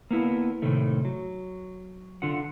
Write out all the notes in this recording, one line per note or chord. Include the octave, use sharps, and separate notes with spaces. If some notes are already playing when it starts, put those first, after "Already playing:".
A#3 B3 E4
A2 C3 D#3 A3
F#3
D3 F4 F#5